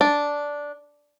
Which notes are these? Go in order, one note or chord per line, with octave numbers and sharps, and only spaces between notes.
D4